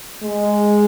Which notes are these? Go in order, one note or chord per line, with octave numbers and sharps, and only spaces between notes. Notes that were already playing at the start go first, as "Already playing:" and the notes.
G#3